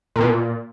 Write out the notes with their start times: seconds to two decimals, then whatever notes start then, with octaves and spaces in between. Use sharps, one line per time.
0.16 A#2
0.21 B2
0.26 A#2